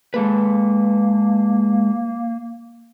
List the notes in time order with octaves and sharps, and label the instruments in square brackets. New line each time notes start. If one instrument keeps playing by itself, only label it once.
[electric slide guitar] G#3 A4 B4 [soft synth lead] A#3